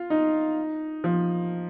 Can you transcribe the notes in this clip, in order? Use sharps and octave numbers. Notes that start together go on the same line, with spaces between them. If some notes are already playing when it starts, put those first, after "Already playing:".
Already playing: F4
D#4
F3